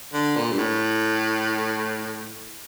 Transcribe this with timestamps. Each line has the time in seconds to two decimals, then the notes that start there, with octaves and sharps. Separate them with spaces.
0.13 D3
0.36 A#2
0.51 G2
0.58 A2